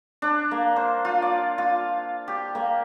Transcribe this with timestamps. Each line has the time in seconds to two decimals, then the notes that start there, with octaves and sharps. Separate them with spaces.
0.22 D4
0.51 A#3
0.76 C5
1.05 F4
1.22 D5
1.58 F4
2.28 G4
2.55 A#3